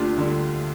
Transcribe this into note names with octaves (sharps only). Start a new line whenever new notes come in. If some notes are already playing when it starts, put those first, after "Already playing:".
Already playing: D2 D4 F4 G4
D3 G3